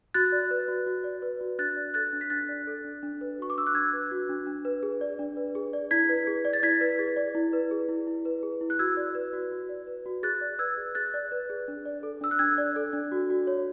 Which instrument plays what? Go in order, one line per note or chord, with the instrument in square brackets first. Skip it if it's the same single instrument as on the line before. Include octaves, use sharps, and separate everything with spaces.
[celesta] F#4 F#6 A6
D5
B4
F#4
F#4
D5
B4
F#4
D4 F#6 A6
D5
A4 F#6 A6
D4
B6
D4 F#6 A6
D5
A4
D4
D4
B4
F#4 C#6
D6
D4 E6
F#6
D4 E6 G#6
B4
F#4
D4
D4
B4
G#4
D5
D4
B4
G#4
D5
E4 G#6 B6
B4
G#4
D5
A6
E4 G#6 B6
B4
G#4
D5
E4
B4
G#4
E4
E4
B4
G#4
E4
F#6
F#4 E6 G#6
D5
B4
F#4
F#4
D5
B4
F#4
G#4 F#6 A6
D5
B4 E6 G#6
G#4
G#4 F#6 A6
D5
B4
G#4
D4
D5
A4
D4 E6
F#6
D4 E6 G#6
D5
A4
D4
F#4
F#4
C#5